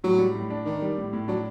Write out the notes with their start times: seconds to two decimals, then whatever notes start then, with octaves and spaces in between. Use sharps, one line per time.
0.04 A2 F#3
0.18 G3
0.35 A2
0.50 D4
0.65 D#3 D4
0.82 G3
0.98 A2
1.13 A2
1.28 F#3 D4